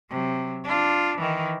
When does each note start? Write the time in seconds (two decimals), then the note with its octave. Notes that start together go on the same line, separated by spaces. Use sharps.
0.10 C3 F#3
0.64 D4 F4
1.19 D#3 E3